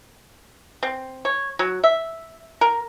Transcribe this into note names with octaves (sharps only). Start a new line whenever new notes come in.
C4
C#5
F#3
E5
A#4